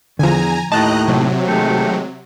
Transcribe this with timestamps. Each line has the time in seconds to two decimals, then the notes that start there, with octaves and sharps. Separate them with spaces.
0.19 E2 D3 F3 G#5 A#5
0.72 D#2 A2 D#5 A5 A#5 F#6
1.08 C3 F#3
1.48 D#3 G#3 A3